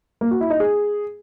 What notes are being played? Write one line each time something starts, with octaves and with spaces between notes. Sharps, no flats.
A#3
F#4
E4
D#4
G#4